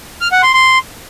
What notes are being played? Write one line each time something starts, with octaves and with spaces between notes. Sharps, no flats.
F6
F#5
C6
C6